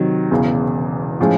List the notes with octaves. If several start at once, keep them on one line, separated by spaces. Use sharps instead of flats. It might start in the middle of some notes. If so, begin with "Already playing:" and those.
Already playing: C3 D#3 F#3
E1 E2 C#3
A2 F3 G#3 C#4